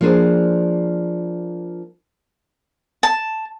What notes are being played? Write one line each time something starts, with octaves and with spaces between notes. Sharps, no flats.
F3 A#3 D4 G#4 C5
A5